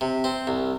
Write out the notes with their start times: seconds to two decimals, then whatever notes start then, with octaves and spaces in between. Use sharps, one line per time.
0.01 C3
0.24 C4
0.47 C2